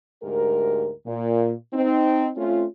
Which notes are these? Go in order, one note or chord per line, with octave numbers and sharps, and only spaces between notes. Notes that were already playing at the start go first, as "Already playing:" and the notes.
D2 G#2 G4 A#4
A#2
C4 D#4
A3 C4 C#4 F4